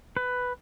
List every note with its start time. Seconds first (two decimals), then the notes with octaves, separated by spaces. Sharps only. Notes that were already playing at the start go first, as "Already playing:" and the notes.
0.17 B4